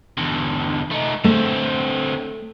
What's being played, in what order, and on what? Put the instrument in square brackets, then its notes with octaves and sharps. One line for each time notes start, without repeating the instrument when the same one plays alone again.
[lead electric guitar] E2 D3
A3 D#4
[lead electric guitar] D3 C4 [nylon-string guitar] A3